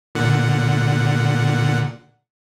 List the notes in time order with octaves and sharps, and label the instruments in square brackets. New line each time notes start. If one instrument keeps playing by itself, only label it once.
[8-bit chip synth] A#2 D3 F#5